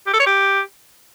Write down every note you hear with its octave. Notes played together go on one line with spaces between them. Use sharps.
G4
A4
C#5
G4